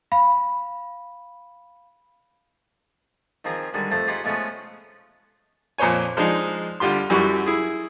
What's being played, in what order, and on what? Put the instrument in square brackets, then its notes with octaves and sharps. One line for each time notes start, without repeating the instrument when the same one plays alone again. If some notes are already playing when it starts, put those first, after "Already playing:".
[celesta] F5 B5
[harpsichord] D#3 F3 C4 G#4 A#5
D3 D#3 G3 G#3
F2 A3 A4 C5 A5
D#4 F4 G4 G#4 C5 F#5
F3 G#3 A3 B3 C#4
[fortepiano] F2 A#2 C5 C#5 G#5
F3 G#3 D4 D#4
D3 G3 F4 G4 C6
F#2 G3 E4 F#4 E5 C#6
E4 G#4